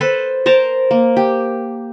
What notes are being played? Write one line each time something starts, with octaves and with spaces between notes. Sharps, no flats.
A4 B4 C5
A#4 C5 A5 A#5
A#3
G4